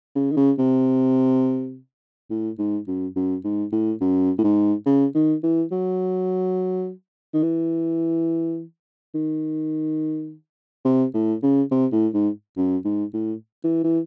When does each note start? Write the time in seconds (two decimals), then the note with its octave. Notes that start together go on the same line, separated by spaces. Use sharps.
0.16 C#3
0.32 D#3
0.37 C#3
0.58 C3
2.30 A2
2.58 G#2
2.87 F#2
3.16 F#2
3.45 G#2
3.72 A2
4.01 F#2
4.38 A2
4.44 G#2
4.86 C#3
5.15 D#3
5.43 E3
5.72 F#3
7.34 D#3
7.43 E3
9.15 D#3
10.85 C3
11.14 A2
11.43 C#3
11.71 C3
11.92 A2
12.14 G#2
12.57 F#2
12.85 G#2
13.14 A2
13.64 E3
13.84 E3